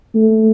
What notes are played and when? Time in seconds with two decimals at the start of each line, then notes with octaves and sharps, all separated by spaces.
0.15 A3